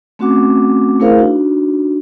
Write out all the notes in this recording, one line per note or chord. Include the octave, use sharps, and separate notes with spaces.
A3 C4 C#4 F#4 F#5 D6
A3 E4 G#4 A#4 C5 F5
D4 D#4 F#4